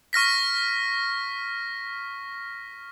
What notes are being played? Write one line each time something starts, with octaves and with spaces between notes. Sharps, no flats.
C#6 F6 A#6 B6